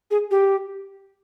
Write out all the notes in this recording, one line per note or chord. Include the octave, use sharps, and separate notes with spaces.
G#4
G4